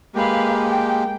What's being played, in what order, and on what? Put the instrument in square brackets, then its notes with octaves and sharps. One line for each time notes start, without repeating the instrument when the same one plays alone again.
[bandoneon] G#3 A#3 G4 [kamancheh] B4 F5
[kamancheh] G5